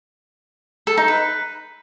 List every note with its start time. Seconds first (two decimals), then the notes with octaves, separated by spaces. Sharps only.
0.87 A4
0.98 D#4
1.08 B4